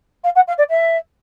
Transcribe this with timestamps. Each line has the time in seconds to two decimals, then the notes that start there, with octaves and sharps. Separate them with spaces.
0.24 F5
0.35 F#5
0.47 F5
0.58 D5
0.69 E5